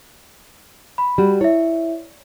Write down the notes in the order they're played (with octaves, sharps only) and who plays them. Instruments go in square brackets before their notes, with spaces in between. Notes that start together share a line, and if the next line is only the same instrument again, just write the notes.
[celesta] B5
[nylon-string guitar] G3 F#4
[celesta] E4 E5 [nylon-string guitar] C#5